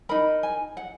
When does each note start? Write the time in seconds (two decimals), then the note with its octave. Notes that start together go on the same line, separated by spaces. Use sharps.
0.09 D#4 A#4 B5
0.43 G#5
0.77 F#5